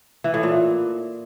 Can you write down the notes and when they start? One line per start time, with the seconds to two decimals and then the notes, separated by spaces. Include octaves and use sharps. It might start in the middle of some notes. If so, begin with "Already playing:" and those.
0.24 E3
0.34 A2
0.43 A#2